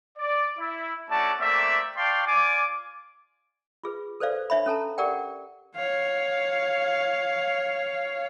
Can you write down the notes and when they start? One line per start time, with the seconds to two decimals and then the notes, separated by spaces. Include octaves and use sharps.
0.18 D5
0.59 E4
1.10 A3 C#4 F#4 D5 A5
1.40 A3 A#3 C4 D5 E5
1.97 D5 F5 G5 A5 C6 C#6
2.27 F4 D5 G#5 D6
3.84 F4 G#4 B4
4.20 A4 B4 C5 D5 F5
4.50 D4 C#5 E5 F5 B5
4.66 C#4 A4 A5 A#5
4.98 G4 A#4 D5 F#5 G5
5.76 C#5 F5